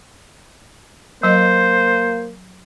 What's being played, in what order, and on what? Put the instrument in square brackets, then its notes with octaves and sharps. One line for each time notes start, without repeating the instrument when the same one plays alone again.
[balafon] F#3 D#5 [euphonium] A#3 [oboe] C5